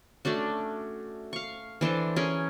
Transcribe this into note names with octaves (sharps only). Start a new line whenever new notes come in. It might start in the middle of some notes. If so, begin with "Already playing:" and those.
A3 C#4 D4 F#4
F5 C#6
E3 D4 A4 C5
C#4 G#4 A#4